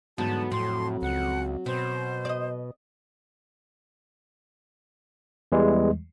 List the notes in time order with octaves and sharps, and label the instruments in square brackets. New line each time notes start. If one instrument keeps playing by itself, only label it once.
[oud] E2 G#2 D3 [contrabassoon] F#3 [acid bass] B3 [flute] A5
[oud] F2 [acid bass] A2 [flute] C6
[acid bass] C#2 [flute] F#5
[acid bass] B2 [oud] B3 C4 [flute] C5
[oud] D5 D#5
[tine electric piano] E2 E3 G3 G#3